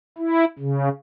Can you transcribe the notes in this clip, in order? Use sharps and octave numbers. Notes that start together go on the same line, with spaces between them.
E4
C#3